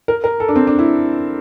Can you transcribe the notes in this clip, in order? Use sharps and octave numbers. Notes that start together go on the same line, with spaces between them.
A#4
A#4
A4
D4
C4
D4
E4